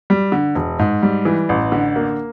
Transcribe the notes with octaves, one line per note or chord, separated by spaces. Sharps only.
G3
D3
E1
G#2
G3
E3
A1
D3
A#3